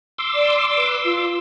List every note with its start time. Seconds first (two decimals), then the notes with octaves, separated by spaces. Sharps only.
0.18 C6 D6 E6
0.34 D5
0.76 B4
1.05 F4